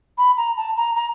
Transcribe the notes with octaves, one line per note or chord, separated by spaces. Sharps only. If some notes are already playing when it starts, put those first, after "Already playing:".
B5
A#5
A5
A#5
A#5